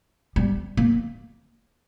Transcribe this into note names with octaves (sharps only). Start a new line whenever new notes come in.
G3
A#3